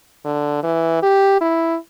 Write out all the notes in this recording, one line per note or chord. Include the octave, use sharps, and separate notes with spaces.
D3
E3
G4
E4